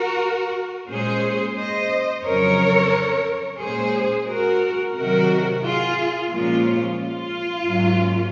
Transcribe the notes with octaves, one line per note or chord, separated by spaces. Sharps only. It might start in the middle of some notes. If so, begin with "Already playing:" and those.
Already playing: F#4 A#4
A#2 G#3 C#4 G#4 C5
C5 D#5
F2 C#3 F#3 A#4 C#5
A#2 G#3 C#4 G#4 C5
F#4 A#4
C3 D#3 F#3 F#4 A#4
F4 G#4
A#2 F3 G#3 C#4 F4
F4
G#2 F#3 A#3 C#4